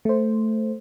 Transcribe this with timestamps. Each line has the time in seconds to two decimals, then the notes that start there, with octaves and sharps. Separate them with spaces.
0.05 A3 C5